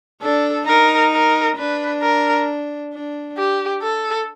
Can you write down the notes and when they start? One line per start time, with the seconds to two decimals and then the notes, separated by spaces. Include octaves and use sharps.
0.22 D4 A4
0.67 D#4 A#4
1.12 A#4
1.58 D4 B4
2.02 A#4
2.93 D4
3.37 G4
3.83 A4